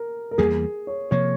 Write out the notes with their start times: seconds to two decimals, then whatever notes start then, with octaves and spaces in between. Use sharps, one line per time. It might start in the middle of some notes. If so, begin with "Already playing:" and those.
Already playing: A#4
0.31 A#4
0.38 E2 E3 G3 A#3 G#4
0.87 C#5
1.11 C3 F3 A#3 C#5